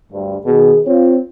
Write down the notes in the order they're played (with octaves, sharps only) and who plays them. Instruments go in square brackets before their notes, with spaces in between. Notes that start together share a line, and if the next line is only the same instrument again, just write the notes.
[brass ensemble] D2 G2
[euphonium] B2 [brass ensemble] D#3 G#4
[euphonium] C4 [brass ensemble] F4 C#5